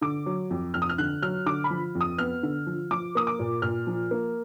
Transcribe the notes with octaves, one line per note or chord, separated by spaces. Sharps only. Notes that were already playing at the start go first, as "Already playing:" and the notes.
D3 D6
F#3
F2
F2 F6
D#6
F6
D3 F#6
F#3 F6
D3 D6
B5
F3
F2
D#6
B3 F6
D3
F3
F3 D6
A#3 D#6
D6
A#2
A#2 F6
F3
A#3